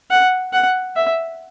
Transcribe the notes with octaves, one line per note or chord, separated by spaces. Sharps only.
F#5
F#5
E5